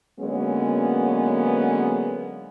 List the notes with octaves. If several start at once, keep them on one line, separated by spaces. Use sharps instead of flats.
D3 F#3 G#3 A#3 B3 C#4